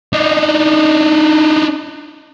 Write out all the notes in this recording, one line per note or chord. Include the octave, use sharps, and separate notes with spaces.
D4 D#4